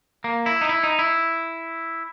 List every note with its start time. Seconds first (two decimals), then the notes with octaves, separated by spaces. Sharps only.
0.24 A#3
0.46 E4
0.61 D#4
0.69 E4
0.83 D#4
0.99 E4